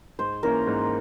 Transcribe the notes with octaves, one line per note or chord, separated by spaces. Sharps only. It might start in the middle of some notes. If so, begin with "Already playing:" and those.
G#2 C5
E3 A#3 C#4 A#4
G#2